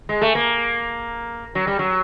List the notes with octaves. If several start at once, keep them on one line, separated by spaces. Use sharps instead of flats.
G#3
A3
A#3
F#3
G3
F#3